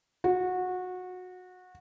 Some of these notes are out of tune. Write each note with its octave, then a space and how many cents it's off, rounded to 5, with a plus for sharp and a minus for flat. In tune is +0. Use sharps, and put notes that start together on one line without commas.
F#4 -20